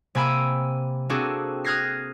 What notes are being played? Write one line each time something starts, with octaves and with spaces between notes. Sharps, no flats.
C3 A#3 G#5 B5 E6 D7
A#3 C4 D4 F#4 G#4 A4
D#6 F6 F#6 G#6 A#6 C7